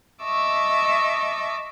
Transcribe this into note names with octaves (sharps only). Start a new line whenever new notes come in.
D#5 E5 A5 C#6 D6 E6